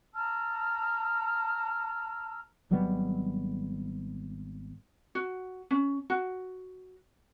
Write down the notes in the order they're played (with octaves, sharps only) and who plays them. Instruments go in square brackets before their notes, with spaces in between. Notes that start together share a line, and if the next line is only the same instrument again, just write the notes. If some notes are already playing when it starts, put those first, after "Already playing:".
[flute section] A5 A#5 E6 F6
[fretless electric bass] G#1 F#3 G3 B3
[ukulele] F#4
C#4
F#4